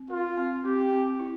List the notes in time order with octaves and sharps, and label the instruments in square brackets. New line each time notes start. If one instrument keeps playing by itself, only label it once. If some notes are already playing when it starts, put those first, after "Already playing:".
Already playing: [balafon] C4
[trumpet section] F4 [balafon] A#4
[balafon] C4
[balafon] C4 [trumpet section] G4
[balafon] C4
E4